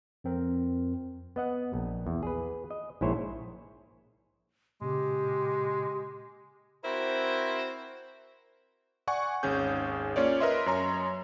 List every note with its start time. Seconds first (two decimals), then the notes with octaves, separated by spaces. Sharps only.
0.24 F2 C4 A#4
1.36 B3 D#5 F#5
1.74 A#1
2.07 E2
2.23 G#4 B4
2.71 D#5
3.01 A#1 G#2 E4 G#4 C5 C#5
4.82 A#2 C#3 G#3 G4
6.85 C4 E4 F#4 A#4 C5
9.07 D5 F#5 G#5 C#6
9.43 G#1 D#2 C#4 G#4 G6
10.16 A#3 C#4 F4 C#5 D5
10.40 A#4 B4 D#5 E5 C6
10.66 F#2 C#5 A#5 C6